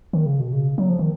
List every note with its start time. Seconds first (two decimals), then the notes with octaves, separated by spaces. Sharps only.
0.13 D#3
0.26 C#3
0.40 B2
0.53 C#3
0.78 F#3
0.89 F3
0.99 D#3